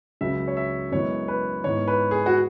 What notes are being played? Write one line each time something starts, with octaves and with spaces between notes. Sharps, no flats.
C#2 C#3 F#3 E5
C#5
E5
F#2 E3 G#3 B3 C#5
B4
G#2 E3 B3 C#5
B4
G#4
F#4